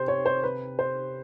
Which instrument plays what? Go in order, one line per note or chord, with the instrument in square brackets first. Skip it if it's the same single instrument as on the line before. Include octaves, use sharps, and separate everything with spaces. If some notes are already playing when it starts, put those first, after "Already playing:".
Already playing: [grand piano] C3 [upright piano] C5
[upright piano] C#5
C5
B4
C5